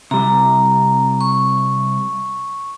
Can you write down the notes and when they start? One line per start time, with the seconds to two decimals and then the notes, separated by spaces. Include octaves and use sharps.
0.11 C3 G3 A#5
1.21 C#6